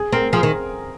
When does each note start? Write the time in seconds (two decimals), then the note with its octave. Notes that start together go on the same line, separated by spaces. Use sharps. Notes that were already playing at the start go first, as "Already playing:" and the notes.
Already playing: G#4
0.12 C4 A#4
0.33 F3 G#4
0.43 D#3